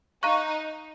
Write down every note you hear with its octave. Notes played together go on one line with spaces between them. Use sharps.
D#4 F5 A#5 C#6 F#6